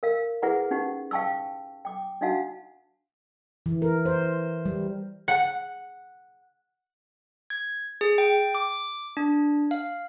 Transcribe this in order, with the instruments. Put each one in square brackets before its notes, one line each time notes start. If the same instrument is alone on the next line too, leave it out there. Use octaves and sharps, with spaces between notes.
[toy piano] A#4 F5
E4 G#4 B4 F#5 A#5
C#4 D#4 G4 F#5
F5 G5 A5 C#6 E6
G5 D6
D4 D#4 F#4 F5 F#5 A5
[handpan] E3
A#4
C5
G3
[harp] F#5
[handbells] G#6
G#4
G5
D6
D4
F5